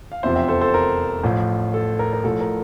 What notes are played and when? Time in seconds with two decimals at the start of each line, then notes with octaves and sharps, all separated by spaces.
0.12 F5
0.23 F1 E2 C3 F3 C5 E5
0.36 E5 G5
0.48 A4 C5
0.61 A4 C5
0.74 A#4
1.23 A1 A2 F3
1.74 A4
1.99 A#4
2.13 A#4
2.24 A1 A2 F3 A4
2.40 A#4